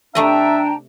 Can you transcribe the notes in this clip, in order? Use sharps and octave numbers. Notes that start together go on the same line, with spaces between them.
C3 A3 D4 D#5 E5 G5 A5 A#5